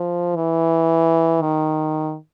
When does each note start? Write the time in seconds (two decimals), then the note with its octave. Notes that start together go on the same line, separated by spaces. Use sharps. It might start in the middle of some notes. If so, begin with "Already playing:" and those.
Already playing: F3
0.36 E3
1.42 D#3